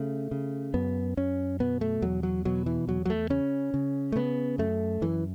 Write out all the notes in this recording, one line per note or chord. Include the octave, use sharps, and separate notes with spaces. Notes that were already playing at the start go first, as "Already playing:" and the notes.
Already playing: C#3 A3
C#3
F#2 B3
F#2 C#4
B2 B3
A3
E2 F#3
F#3
B2 F#3
E3
E2 F#3
F#3
A3
C#3 C#4
C#3
A3
C#3 B3
F#2 A3
F#2 E3